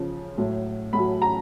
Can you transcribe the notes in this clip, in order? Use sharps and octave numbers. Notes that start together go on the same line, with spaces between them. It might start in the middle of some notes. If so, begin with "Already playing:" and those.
Already playing: C#3 F3
A2 F#3
A2 B5
F#3
A#5